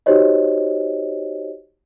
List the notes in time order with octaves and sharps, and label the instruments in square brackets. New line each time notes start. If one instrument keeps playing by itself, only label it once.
[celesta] D#4 F#4 G4 C5 C#5 D#5